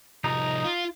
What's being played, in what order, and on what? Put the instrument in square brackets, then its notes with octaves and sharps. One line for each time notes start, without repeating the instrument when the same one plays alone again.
[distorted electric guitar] C2 F3 [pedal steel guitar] D#4 A#5
[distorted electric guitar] F4